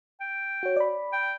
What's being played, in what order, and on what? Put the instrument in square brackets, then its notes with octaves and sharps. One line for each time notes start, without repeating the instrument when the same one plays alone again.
[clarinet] G5
[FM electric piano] F#4 C#5
D5 B5
[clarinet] G5